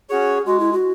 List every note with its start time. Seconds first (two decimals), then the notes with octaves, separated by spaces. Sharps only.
0.09 C#4 F#4 G#4 C#5
0.46 G#3 F#4
0.59 E4
0.73 F#4